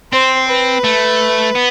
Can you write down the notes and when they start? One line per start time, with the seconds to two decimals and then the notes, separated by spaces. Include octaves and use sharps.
0.12 C4 C5
0.48 B4
0.84 A3
1.55 B3